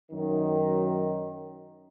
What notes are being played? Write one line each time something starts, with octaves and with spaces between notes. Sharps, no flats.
F#2 D#3